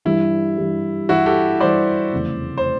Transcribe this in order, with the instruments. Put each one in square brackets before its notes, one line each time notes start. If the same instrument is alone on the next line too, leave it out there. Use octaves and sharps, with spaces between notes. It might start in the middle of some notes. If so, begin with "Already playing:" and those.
[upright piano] G2 E3 G3 [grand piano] E4
[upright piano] G2 E3 G3
[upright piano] G2 E3 G3 [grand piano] E4 F#4
[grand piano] G4 A4
[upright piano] G2 E3 G3 [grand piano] C5 D5
[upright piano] F1 E2 C#3 E3 A3
[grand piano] C5